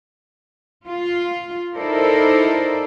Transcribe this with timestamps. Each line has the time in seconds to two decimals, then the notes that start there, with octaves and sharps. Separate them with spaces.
0.87 F4
1.76 D#4 E4 A4 A#4 C5 D5